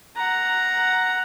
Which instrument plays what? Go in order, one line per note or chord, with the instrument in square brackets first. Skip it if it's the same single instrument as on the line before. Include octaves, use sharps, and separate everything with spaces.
[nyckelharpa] F#5 A#5